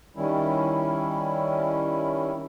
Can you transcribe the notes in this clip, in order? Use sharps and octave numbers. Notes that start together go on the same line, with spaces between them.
D#3 G3 C#4 E4